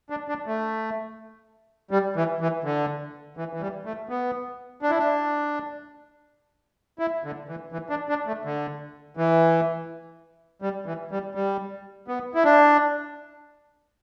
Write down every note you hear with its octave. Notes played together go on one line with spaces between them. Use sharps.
D4
D4
A3
G3
E3
E3
D3
E3
E3
G3
A3
B3
D4
E4
D4
E4
D3
E3
E3
D4
D4
A3
D3
E3
G3
E3
G3
G3
B3
E4
D4